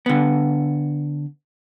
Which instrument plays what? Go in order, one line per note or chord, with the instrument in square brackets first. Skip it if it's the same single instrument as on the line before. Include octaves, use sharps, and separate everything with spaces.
[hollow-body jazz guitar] D3 B3